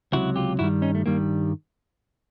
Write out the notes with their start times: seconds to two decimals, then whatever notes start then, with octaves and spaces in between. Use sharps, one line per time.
0.13 C#2 C3 D#3 F#3 E4 F#4
0.36 F4 G4
0.59 G2 D#3 G3 E4 F#4
0.82 C#4 D#4
0.95 A3
1.06 G2 D#3 G3 A#3